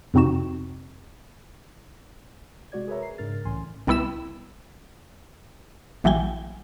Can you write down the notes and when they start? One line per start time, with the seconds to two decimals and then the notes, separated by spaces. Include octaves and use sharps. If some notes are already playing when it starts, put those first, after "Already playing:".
0.14 F2 C3 C4 D#4 F#4 E7
2.72 C3 G#3 F#4 D5 G#6
2.88 G#4 A#4 B4 C#5 E5 A#5
3.02 C7
3.18 G#2 C#3 D4 A#4 F6 A6
3.45 C2 A2 E3 C#4 G#5 C6
3.87 C2 G3 B3 E4 B5 E7
6.04 A#1 E3 F#3 G3 G5 G#5